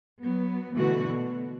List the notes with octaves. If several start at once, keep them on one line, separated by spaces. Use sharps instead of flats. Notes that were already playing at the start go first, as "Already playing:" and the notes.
F#3 B3
B2 D3 E3 A3 F#4
B2